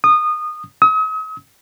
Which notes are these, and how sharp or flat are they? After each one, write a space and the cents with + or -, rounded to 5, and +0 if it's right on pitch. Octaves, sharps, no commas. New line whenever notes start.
D#6 -20
D#6 +45